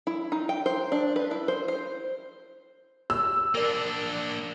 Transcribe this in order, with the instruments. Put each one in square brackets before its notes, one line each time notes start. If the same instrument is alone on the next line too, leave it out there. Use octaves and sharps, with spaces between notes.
[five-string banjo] E4
D#4
G5
C5
D4
B4
E4
C5
C5
[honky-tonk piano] E6
[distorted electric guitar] A#3 D4 [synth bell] A#4 D5